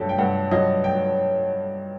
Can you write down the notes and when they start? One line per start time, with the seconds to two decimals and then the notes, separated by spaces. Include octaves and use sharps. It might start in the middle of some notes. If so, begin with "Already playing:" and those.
Already playing: G2 F#3 G4 A4
0.09 G5
0.18 G2 F#5
0.51 F#3 D#5
0.84 G5